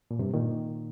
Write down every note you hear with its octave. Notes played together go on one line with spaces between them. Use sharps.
A#2
G2 C3
A#2 D#3